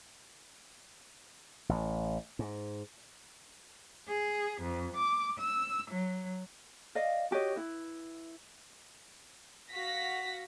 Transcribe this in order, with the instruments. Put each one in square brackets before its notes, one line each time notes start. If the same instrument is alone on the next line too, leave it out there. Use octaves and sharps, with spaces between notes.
[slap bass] A1
G#2
[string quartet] G#4
F2
D6
E6
F#3
[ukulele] D5 D#5 F5
F#4 G4 C#5 D#5
E4 B4
[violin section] F#4 F5 A#6 B6